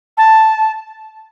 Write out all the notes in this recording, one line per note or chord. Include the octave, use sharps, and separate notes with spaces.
A5